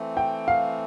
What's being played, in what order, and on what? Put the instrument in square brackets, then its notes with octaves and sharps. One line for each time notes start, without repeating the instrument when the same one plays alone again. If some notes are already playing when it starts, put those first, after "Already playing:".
Already playing: [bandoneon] E3 A3 C4
[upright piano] G5
F5